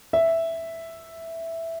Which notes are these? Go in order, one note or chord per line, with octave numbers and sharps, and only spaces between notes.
E5